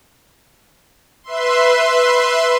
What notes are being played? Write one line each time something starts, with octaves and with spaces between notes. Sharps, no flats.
B4 E5 C6